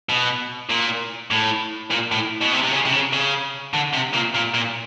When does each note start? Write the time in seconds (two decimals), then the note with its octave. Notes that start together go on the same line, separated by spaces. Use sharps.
0.09 B2
0.70 A#2
1.31 A2
1.91 A#2
2.12 A2
2.41 B2
2.52 C3
2.63 C3
2.73 C#3
2.85 C3
2.92 C#3
3.13 C#3
3.74 D3
3.94 C3
4.14 A#2
4.35 A#2
4.54 A#2